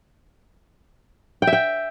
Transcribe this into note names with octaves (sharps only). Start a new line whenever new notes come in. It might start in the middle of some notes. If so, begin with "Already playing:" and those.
G5
E5
G5